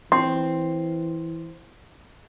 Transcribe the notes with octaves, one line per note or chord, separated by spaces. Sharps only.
E3 C4 C6